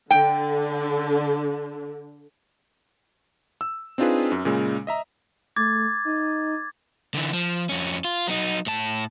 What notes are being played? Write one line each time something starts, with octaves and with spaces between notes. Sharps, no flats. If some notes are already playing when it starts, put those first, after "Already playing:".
D3 G5
E6
C4 D4 D#4 F4 G#4 B4
F#2
A#2 C#3 G#3
D#5 E5 A#5
A3 D6 G#6 A6
D#4
D3 E3
F3
F2 C#4
F4
F#3 D#4
A2 A5